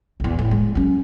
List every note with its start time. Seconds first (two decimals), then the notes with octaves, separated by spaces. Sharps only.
0.20 A#1 E2
0.39 A2
0.51 G#3
0.75 F#3 C#4